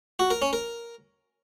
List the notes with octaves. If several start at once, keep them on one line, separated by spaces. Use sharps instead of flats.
F#4
A#4
C#4
A#4